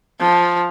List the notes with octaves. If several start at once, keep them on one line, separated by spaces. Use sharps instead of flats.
F3